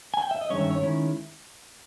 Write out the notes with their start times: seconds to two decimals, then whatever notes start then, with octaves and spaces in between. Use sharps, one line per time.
0.14 G#5
0.22 G5
0.31 E5
0.41 D#5
0.50 G2 D#3 G#3 C#4 C#5
0.61 E5
0.71 C#5
0.81 D#3 G#3 C#4 E4